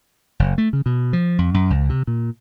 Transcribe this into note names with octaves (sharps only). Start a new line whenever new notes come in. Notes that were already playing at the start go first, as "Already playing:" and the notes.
F#1
A3
C#3
B2
F3
F2
F#2
C#2
C3
A#2